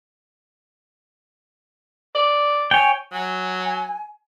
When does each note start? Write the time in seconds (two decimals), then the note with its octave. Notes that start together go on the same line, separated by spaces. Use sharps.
2.15 D5
2.71 C#5 G5 G#5
3.13 F#3 G#5